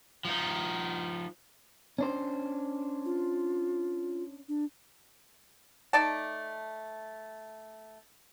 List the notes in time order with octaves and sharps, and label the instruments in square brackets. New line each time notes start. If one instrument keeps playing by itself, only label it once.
[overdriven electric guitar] F3 D#4
[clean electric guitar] C#4 D4 C5
[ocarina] F4
D4
[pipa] A3 D#4 D5 A5